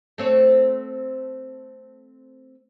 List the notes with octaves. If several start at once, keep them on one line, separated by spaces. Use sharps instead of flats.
A3 C4 C#5